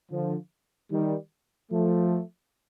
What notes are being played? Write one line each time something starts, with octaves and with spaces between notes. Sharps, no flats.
D3 F3
D#3 G3
F3 A3